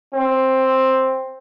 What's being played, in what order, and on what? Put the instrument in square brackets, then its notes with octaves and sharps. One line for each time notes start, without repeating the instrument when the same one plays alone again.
[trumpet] C4